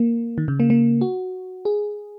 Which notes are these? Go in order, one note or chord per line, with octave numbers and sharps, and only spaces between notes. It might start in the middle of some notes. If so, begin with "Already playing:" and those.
Already playing: A#3
D#3
C#3
A#3
A#3
F#4
G#4